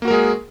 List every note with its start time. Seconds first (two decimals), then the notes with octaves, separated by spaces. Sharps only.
0.02 A#3
0.05 F#4
0.08 A#4
0.11 G#3
0.13 G#4